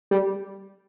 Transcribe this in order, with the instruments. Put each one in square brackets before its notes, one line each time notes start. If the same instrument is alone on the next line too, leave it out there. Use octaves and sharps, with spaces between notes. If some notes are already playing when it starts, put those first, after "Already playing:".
[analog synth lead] G3